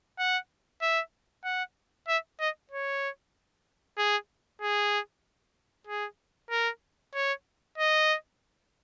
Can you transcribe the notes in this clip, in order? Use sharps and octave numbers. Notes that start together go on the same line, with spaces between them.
F#5
E5
F#5
E5
D#5
C#5
G#4
G#4
G#4
A#4
C#5
D#5